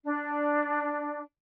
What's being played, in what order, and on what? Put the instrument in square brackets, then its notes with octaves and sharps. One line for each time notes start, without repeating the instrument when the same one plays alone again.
[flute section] D4